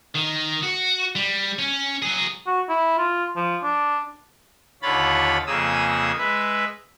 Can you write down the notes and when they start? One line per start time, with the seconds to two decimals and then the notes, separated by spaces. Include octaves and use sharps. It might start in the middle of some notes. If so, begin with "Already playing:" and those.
0.15 D#3
0.63 F#4
1.16 G3
1.59 C#4
2.02 F#3 G#4
2.47 F#4
2.69 E4
2.98 F4
3.36 F3
3.63 D4
4.82 D#2 D3 F4 C#5 B5 A6
5.47 F2 C#3 A#3 G#4 D#6 E6
6.18 G#3 B4 E5